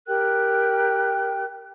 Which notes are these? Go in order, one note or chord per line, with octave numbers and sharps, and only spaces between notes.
G4 A#4 G5 F#6